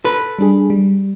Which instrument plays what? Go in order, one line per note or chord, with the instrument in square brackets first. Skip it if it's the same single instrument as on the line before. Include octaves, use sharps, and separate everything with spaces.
[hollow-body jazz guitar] A4 B4
[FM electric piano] G3 D4 G#4
G3